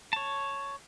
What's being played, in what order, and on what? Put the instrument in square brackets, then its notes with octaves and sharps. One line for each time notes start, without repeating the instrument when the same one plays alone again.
[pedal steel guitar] C#5 A5